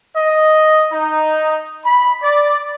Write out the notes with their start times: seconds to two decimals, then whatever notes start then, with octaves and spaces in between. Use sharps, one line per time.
0.15 D#5
0.92 D#4
1.85 B5
2.22 D5